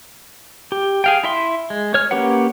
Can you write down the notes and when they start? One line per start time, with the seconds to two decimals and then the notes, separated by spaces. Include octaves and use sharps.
0.72 G4
1.04 G#4 F5 G5
1.24 E4 E5 C6
1.70 G#3
1.94 C#5 F6
2.11 A#3 C#4 G4 B4 F#5